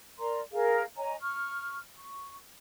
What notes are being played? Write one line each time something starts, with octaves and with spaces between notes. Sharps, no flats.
A#4 D5 A#5 C6
G#4 A#4 F5
C#5 D#5 G#5 A#5
C#6 F6
C#6